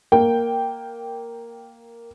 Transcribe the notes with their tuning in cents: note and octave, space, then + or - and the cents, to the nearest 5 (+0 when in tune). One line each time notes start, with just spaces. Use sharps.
A#3 +0 G5 +0